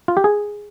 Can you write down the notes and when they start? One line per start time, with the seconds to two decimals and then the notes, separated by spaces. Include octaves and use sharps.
0.08 F4
0.17 G4
0.24 G#4